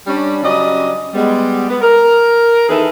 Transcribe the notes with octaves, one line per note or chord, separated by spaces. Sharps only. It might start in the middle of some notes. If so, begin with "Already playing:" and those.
G3 C#4 D4
C#3 F#3 G3 C#4 D5 D#5
G3 G#3 B3
B3
A#4
D#3 E3 E4 G#4 A4 B4